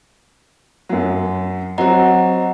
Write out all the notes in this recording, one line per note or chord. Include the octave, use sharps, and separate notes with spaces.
F#2 F#3
F#3 C4 F#4 D#5 F#5 A#5